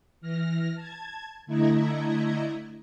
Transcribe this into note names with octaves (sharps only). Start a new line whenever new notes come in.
E3 F6 A#6
A5 G#6
D3 A3 E4 D#5 A#5 G#6